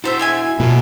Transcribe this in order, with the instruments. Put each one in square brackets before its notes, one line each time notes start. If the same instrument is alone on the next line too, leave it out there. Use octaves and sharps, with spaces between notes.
[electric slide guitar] E4 F#4 [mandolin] A4 C5 E5
[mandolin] G#4 E5 G#5
[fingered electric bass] B2 [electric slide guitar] A#3 F4 A4